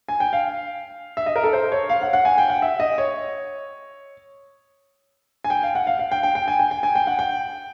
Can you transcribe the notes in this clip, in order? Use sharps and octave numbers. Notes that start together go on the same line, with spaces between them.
G#5
G5
F5
E5
D#5
A#4
A4
C5
C#5
F5
F#5
F#5
G#5
G5
F#5
E5
D#5
C#5
G#5
G5
F5
F#5
F5
F5
G5
G5
G5
G#5
G5
G5
G#5
G5
F#5
G5